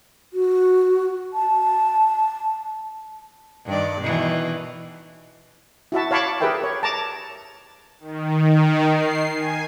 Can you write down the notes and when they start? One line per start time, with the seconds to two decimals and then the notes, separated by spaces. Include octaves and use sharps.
0.33 F#4
1.33 A5
3.66 G2 D#3 D5
4.01 B2 D#3 E3
5.92 E4 F#4 E5 A5
6.11 C#5 F5 A5 B5 C#6 D6
6.41 G4 G#4 A#4 B4 E5 G5
6.63 C#5
6.83 A5 A#5 D6
8.00 D#3
8.92 C7
9.33 G#5